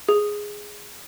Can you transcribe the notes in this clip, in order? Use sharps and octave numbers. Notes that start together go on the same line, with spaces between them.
G#4